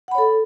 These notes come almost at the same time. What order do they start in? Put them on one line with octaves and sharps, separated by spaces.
F#5 B5 C#5 A4